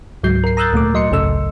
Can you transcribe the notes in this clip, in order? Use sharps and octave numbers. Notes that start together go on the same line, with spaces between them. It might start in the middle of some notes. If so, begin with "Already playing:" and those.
C#2 G#2 F#3 G6 C7
A#4 C7
A#5 D#6 E6 F#6 G6 A6
D2 A#2 A3 D6
F#3 D#5 C6 C#7
G#1 C#2 F#2 C#3 A4 E6